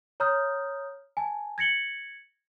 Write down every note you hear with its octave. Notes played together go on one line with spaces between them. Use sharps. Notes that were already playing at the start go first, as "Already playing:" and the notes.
C#5 A#5 D#6 F6 G6
G#5 A5
G#6 A#6 C#7 F#7 G7